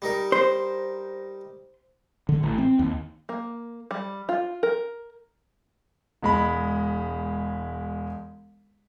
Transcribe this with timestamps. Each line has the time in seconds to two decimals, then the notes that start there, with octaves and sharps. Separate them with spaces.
0.02 G3 D#4 A#4
0.32 C5
2.29 D3
2.43 A1
2.58 C4
2.79 D#2
3.29 A#3
3.91 G3
4.29 F4
4.63 A#4
6.23 E1 G#3 B5